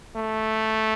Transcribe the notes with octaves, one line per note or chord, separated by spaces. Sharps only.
A3